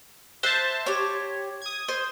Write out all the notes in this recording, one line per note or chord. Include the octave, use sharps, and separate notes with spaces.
C5 E5 A5 F#6
G4 C#5
D#6 G#6
C5